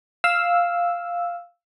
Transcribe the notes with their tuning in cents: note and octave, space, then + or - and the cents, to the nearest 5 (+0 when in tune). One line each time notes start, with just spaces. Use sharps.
F5 +0 E6 +0